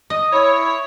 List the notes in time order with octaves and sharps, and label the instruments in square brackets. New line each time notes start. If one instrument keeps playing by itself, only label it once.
[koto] D#5
[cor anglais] E4 [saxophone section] C#5